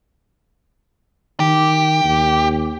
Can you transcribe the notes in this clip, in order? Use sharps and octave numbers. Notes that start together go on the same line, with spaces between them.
D#3 G4
D#2